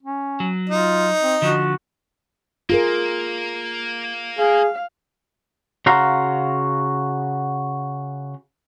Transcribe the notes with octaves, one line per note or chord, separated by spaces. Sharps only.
C#4
F#3
D#4 F4
C4
D3 F3 F#4
A#3 F4 G#4 A#4
G#4 F5
C#3 F#4 F5 A#5 C6